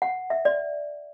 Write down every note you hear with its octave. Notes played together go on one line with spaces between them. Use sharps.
F#5
E5
D5